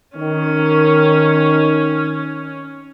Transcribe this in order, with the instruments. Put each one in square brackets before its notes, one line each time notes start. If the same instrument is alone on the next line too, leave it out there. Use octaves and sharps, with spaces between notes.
[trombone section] D#3 [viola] C#4